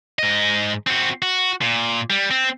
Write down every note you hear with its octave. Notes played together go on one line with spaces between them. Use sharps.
G#2 D#5
C4 F#4
F#4
A#2
G3
C4